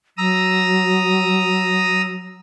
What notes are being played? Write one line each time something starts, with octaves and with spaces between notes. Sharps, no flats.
F#3 A#5 D#6 E6